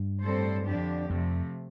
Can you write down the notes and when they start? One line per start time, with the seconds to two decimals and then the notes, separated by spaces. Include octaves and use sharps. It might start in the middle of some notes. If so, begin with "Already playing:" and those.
Already playing: G2
0.22 A2 G3 C4 A4 C5
0.66 F2 D3 F3 D4 G4
1.10 F2 C3 F3 A3